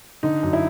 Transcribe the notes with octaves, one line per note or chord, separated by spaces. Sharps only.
D3 D#4
F#2
E4